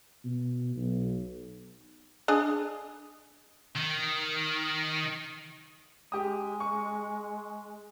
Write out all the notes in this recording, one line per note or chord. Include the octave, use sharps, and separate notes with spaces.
B2
B1
D4 G#4 D#5
D#3
G#3 G4 D#6
C#6